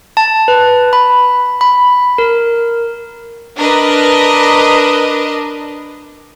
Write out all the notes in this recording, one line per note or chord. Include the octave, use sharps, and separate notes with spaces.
A5
B4
B5
B5
A#4
D4 A#4 B4 D#5